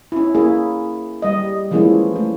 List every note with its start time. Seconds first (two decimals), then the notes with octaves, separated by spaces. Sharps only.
0.12 C#4 E4
0.35 A#3 E4 G#4
1.22 G3 D#5
1.71 E3 F3 G#3 A#3 C#4 E4
2.16 A3